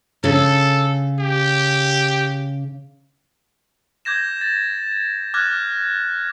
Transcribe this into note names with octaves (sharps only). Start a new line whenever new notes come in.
C#3 A4
G4
D6 G6 G#6 A#6 E7
A6
D6 F6 F#6 G#6 A#6